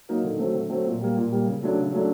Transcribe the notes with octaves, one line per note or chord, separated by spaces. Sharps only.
F#3 A#3 D#4
D3
F#3 A3 C4
D3
F#3 A3 C4
A#2
G3 A#3
A#2
G3 A#3
C#3
F#3 A3 D4
C#3
F#3 A3 D4